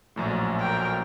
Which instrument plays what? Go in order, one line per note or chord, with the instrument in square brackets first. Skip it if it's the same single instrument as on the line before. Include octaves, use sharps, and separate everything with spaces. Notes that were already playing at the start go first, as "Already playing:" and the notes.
[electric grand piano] A#1 F#2 A2
[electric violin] A#4 G5